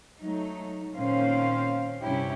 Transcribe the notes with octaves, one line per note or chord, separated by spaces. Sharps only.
F#3 A3 D#4
A#2 D#3 C4 C#4 C5 F5
G2 C3 C#4 E4 G4